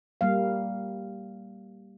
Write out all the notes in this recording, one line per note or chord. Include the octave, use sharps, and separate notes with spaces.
G3 A#3 F5